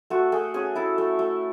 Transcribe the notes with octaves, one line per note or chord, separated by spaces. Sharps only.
A3 F#4
A3 G#4
C#4 G#4
E4 A4
A3
A3